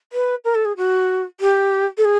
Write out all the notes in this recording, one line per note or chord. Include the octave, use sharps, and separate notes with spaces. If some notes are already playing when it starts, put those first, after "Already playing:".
B4
A#4
A4
G#4
F#4
G4
A4
G#4